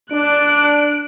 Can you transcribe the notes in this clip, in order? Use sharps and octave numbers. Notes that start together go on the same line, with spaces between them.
D4 F#6 D7